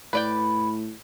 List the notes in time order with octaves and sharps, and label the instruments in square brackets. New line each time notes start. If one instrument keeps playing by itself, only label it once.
[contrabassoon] A2 [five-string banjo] B4 D5 G5 [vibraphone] B5